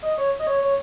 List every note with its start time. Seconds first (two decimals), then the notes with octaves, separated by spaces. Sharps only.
0.03 D#5
0.18 C#5
0.39 D#5
0.47 C#5
0.62 C#5